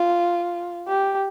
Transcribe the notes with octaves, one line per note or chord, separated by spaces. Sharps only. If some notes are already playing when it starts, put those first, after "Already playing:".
Already playing: F4
G4